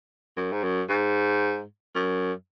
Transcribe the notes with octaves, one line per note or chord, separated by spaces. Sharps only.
F#2
G#2
F#2
G#2
F#2